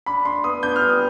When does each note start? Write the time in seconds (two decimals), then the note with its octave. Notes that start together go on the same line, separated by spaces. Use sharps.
0.06 D4 B5
0.25 D4 C6
0.44 B3 D#6
0.63 D4 G6
0.76 F6
0.81 G3
0.89 D#6